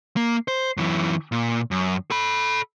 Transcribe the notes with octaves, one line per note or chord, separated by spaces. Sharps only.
A#3
C5
F#2 E3
A#2
F#2
A4 B5